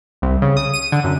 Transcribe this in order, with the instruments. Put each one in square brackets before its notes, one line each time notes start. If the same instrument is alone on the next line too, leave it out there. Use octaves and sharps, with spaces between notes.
[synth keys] C2
C#3
D#6
D#7
D3
F#2